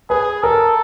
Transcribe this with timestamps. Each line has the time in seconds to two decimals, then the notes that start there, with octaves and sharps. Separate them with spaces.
0.10 G#4 B4
0.43 A4 A#4